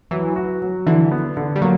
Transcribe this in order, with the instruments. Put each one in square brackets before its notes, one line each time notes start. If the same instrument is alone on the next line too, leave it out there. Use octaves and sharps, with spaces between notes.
[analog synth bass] E3 [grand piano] F#3
[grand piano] F#4
F#3
[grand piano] D3 [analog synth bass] E3
[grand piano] B3
D3
[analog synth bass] G3
[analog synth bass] F#3 [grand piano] A#3